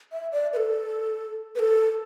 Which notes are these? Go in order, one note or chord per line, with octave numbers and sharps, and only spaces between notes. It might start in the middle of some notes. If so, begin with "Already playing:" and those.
E5
D5
B4
A4
B4
A4